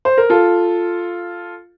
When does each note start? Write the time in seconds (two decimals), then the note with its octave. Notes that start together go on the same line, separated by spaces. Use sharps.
0.05 C5
0.18 A#4
0.30 F4 A4